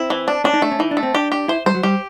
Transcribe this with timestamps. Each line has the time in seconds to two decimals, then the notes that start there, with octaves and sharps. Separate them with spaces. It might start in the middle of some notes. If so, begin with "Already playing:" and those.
Already playing: C4 E4
0.10 E3
0.28 D4
0.44 C#4 D4
0.54 D#4
0.62 A3 D4
0.71 C#4
0.79 E3 D#4
0.91 D4
0.97 A3
1.03 C4
1.14 D4 G4
1.32 G4
1.48 E4 C5
1.66 G3 C5
1.74 F#3
1.83 G3 G4